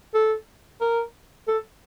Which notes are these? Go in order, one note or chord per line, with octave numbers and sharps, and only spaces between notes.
A4
A#4
A4